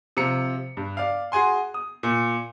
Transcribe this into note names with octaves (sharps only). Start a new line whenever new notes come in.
C3 F3 A#5 C#7
G2
D5 F5
F#4 G#4 G#5 C6
D#6
A#2